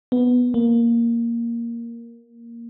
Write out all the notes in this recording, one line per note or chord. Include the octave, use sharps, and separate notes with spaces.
B3
A#3